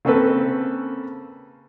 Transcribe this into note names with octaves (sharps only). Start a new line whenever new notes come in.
C#3 A#3 C4 C#4 A4 B4